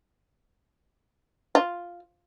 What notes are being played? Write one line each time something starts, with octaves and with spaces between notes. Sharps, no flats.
F4